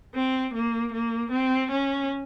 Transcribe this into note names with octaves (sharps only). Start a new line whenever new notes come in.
C4
A#3
A#3
C4
C#4